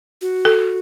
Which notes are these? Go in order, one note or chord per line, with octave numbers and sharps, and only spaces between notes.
F#4
A4